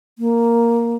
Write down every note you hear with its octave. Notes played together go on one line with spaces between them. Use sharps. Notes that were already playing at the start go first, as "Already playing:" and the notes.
A#3